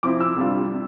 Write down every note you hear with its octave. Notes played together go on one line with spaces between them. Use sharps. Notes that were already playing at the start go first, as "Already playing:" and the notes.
C3 F3 C4 E4 D6
E6
C2 C3 G3 D4 F4
C3